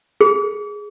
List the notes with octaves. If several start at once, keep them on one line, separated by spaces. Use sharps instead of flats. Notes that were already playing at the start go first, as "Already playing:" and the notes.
G#4